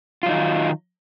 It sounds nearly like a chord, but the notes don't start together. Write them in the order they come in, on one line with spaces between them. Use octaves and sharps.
F4 F#3 D#4 D#3